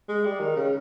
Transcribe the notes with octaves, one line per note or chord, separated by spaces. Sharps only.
G#3
G3
D#3
C#3